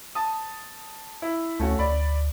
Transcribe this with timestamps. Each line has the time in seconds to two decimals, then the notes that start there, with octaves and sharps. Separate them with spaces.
0.15 A5 D#6
1.22 E4
1.59 D2 A3 C#4 F#4
1.79 D2 D5 B5